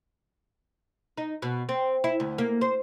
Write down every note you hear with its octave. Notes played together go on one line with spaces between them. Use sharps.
D#4
B2
C4
E4
D2
A#3
C5